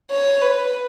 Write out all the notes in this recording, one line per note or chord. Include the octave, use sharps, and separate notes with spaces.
C#5
B4